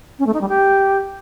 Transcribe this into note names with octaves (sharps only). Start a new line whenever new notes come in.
C#4
A3
D#4
G3
G4